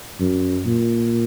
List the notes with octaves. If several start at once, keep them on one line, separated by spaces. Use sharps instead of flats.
F#2
A#2